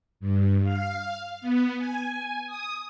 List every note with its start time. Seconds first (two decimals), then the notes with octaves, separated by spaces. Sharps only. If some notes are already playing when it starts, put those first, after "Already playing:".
0.20 G2
0.64 F5
1.41 B3
1.78 G#5
2.47 D#6